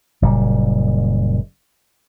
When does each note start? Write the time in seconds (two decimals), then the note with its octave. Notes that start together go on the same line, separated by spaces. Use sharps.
0.22 F#1 A#2 G3